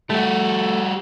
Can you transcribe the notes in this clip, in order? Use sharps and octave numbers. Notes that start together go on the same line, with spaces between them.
G3 A3 F#4